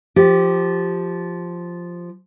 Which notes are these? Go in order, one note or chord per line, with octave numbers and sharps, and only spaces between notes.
F3 G4